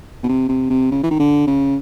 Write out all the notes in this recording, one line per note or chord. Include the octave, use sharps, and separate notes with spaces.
B2
C3
C3
C3
C#3
E3
D#3
D3
C#3